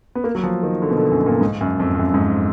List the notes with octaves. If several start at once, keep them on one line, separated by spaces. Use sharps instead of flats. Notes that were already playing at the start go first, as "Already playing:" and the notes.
B3
A#3
F#3
F3
D#3
D3
B2
D3
F#2
A#2
G#2
F#2
F2
F2
F#2
G#2